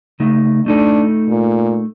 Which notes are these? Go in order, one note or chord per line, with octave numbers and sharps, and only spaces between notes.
C#3 A3 D#4
A3 D4 D#4 A4
A#2